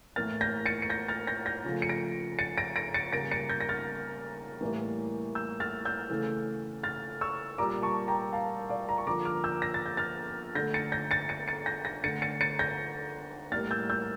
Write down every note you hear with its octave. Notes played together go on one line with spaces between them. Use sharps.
A2 E3 A#3 F6 A6
G6 A#6
A6 C#7
C#7
G6 A#6
F6 A6
G6 A#6
G6 A#6
C#3 F3 A3
C#7
A#6 D7
A6 C#7
A#6 D7
A#6 D7
A6 C#7
C#3 G3 A#3 A#6 D7
A6 C#7
G6 A#6
A#6
F6 A6
A2 E3 G3 A#3
E6 G6
F6 A6
E6 G6
C#3 E3 A3
F6 A6
C#6 E6
A#2 G3 A#3 A#5 D6
A5 C#6
G5 A#5
F5 A5
D5 F5
A#5
C#6
D3 F3 A#3 A#5 D6
D6 F6
E6 G6
A#6
A6
G6
F6 A6
D3 A3 G6 A#6
A6 C#7
G6 A#6
A6 C#7
A6 C#7
A6 C#7
G6 A#6
G6 A#6
D3 A3 A6 C#7
A6 C#7
A6 C#7
G6 A#6
A2 G3 A#3 F6 A6
E6 G6
E6 G6